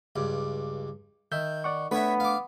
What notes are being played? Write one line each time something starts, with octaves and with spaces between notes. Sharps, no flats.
C#2 G2
D#3 E5 G6
D5 F#5 C#6
A3 B3 D4 B4 C#5 E5 B5
F5 D6